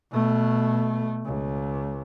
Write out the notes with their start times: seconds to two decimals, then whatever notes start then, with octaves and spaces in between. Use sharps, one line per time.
0.12 B2 A3
1.25 C#2